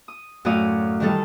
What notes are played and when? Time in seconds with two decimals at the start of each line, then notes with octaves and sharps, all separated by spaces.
0.08 D#6
0.45 F#2 A2 F#4 D5 F5 D#6
1.00 D#3 E3 G3 D#4 A4